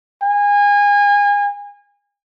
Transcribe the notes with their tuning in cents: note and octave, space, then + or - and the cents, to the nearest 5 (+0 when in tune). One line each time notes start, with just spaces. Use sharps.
G#5 -30